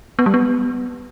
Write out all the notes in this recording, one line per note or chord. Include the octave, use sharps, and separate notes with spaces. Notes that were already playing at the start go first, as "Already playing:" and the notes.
B3
G3
B3